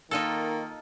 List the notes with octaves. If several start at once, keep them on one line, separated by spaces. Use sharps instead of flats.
D#3 A#3 D#4 F4 A4